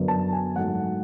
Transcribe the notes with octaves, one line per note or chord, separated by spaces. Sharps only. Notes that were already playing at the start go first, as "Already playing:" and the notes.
Already playing: F#2 D3 F#3 B3
A5
G#5
G#2 F#3 A3 F#5